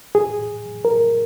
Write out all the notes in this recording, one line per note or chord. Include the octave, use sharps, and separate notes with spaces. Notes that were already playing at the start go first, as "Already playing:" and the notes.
G#4
A#4